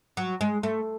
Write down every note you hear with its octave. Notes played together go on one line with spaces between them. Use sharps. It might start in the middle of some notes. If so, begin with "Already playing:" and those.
F#3
G#3
A3